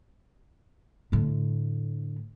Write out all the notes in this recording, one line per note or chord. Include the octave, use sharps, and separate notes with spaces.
A2 D3